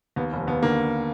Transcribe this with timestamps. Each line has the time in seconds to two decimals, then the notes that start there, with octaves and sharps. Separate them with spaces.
0.16 D#2 B3
0.33 F1
0.47 D#2 B3
0.63 D3 A#3